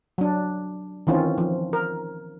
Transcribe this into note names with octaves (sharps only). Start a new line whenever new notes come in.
F#3 D4
D#3 E3 C4 C#4 F4
F3
A#4